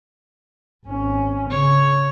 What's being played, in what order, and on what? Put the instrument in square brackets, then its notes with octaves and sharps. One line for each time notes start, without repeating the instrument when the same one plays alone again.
[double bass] G#1 C#4
[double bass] C#3 [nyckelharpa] C#5